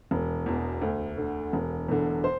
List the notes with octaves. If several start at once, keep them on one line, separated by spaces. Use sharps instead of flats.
E1
E2 B2
D2
D3
E1
E2 D3
C5